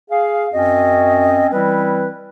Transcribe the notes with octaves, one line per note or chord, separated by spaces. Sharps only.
G#4 F5
F#2 C4 C#4 F#4 D#5
E3 G3 C4 E4 B4